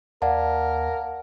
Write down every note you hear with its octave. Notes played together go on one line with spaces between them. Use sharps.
D#2 A#4 D5 F5 F#5 A5